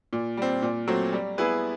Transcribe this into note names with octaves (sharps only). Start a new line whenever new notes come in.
A#2
G3 C4
A#2
F#3 A3 C4
G3
B3 E4 G#4 B4